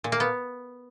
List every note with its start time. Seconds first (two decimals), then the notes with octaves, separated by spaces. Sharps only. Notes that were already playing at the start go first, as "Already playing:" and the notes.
0.04 A#2
0.12 A#3
0.20 B3